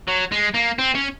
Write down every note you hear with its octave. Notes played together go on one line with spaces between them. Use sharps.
F#3
G#3
A#3
C4
C#4